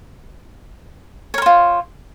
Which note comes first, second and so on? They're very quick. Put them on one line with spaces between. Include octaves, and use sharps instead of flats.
C#5 A#4 C5 F4